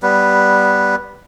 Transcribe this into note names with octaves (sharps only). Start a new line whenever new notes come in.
G3 B3 B4